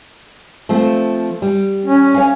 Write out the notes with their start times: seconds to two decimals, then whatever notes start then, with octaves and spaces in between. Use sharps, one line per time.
0.69 F3 A3 C4
1.42 G3
1.86 C#4
2.14 C#5 F5 G#5